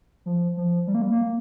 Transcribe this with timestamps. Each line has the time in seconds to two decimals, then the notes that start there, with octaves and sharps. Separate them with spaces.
0.26 F3
0.57 F3
0.87 G3
0.94 A#3
1.02 G3
1.11 A#3